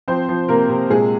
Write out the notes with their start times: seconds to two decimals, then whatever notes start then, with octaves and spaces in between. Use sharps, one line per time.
0.08 F3 C4 C5
0.29 F3
0.48 C3 A#3 A#4
0.69 C3
0.90 A#2 G#3 G#4